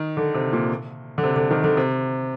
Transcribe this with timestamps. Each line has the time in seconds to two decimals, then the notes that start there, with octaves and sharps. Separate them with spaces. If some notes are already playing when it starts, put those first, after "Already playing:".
Already playing: D#3
0.17 D3
0.34 C3
0.53 A#2
1.18 D3
1.24 C3
1.36 D3
1.51 D#3
1.64 D3
1.77 C3